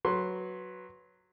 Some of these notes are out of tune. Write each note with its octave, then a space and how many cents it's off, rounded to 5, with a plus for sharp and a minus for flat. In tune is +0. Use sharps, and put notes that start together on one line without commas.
F#3 +0 B4 +0 C6 +15